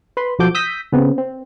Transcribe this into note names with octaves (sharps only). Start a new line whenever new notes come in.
B4 B5 C6
B1 F3 F#4 A4 D6 G6
D#6 E6 G6 A#6 B6
C#3 B3 C4
C4